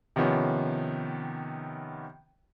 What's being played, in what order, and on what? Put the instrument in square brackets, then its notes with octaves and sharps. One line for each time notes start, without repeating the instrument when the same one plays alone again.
[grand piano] C3 D#3 F3 B3 C#4